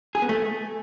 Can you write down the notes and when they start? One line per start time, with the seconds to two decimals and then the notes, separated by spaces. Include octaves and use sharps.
0.15 G#4
0.22 B3
0.29 A3